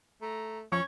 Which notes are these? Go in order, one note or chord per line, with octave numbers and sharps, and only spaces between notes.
A3 A#5
F3 C#4 C#6 G#6